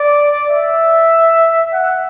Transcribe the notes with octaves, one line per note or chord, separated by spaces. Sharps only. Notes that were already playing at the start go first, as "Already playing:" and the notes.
Already playing: D5
E5
F#5